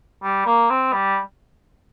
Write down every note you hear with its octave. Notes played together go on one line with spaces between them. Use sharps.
G3
A#3
C4
G3